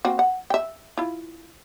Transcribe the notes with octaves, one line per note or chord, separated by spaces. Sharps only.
A#3 C4 F#4
F#5
E5 G5
E4 F4